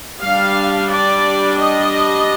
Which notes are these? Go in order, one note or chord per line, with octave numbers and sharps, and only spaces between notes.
G3 D4 F5
D5
D#5